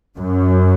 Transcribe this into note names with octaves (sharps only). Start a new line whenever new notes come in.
F#2